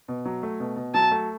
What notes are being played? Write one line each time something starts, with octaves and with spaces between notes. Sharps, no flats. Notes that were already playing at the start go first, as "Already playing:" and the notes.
B2
F#3
A3
B2
B2
F#3 A5
A3